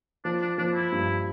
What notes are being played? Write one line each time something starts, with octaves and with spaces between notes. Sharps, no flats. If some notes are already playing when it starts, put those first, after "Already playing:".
F3 D4
D4
F3 D4
E4
G2